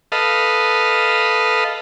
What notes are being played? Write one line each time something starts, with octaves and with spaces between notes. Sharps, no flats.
A4 B4 D#5 F5